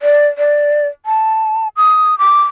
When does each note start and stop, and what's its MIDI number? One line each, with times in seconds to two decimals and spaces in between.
0.01 0.28 74
0.38 0.87 74
1.06 1.68 81
1.77 2.18 87
2.18 2.43 86